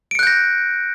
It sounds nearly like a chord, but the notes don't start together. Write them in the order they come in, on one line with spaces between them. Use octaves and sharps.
D7 C#7 F#6 G6 A#6